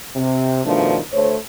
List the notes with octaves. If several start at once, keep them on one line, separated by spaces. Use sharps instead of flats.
C3
G2 B2 D#3 F3 A3 D4
D2 A3 C5 C#5